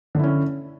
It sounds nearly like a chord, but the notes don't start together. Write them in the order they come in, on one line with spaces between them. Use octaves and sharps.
D3 E4 C#4